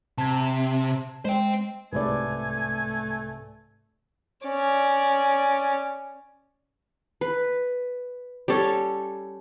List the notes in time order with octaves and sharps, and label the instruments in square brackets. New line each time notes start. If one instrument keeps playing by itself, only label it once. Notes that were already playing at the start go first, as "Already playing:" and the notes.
[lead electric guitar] C3 [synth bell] A5 G#6
[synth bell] G#3 [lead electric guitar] C5 G5
[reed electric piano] C2 G#2 C3 [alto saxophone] A3 [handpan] B4 D5 [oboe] G#5
[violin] C#4 D5
[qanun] B4
G3 C#4 A4 C#5